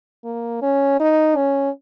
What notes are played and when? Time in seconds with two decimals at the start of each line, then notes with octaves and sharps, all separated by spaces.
0.25 A#3
0.62 C#4
1.00 D#4
1.36 C#4